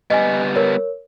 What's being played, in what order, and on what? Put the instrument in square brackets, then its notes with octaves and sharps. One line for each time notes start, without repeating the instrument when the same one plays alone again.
[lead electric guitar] G3 B3 [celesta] D#5 G#5
[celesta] A#4 C#5